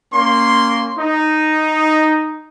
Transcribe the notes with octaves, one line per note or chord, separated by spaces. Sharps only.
A#3 C#4 C6
D#4